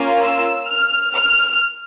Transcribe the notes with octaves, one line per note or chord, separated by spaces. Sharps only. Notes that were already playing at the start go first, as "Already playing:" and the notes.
Already playing: A#3 C#4 F4
E6
F6
F6